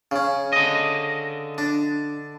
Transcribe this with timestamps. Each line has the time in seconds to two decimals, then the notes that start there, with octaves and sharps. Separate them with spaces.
0.11 C#3 C#4
0.53 D3 D#5
1.58 D4